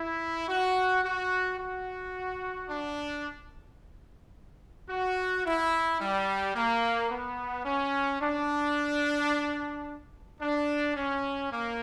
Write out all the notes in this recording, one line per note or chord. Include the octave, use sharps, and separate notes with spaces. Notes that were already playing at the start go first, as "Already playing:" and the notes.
Already playing: E4
F#4
F#4
F#4
D4
F#4
E4
G3
A#3
B3
C#4
D4
D4
C#4
A#3